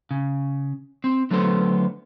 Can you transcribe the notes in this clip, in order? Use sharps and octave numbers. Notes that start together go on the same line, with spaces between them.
C#3
C4
D3 F#3 A3 B3 A4 C5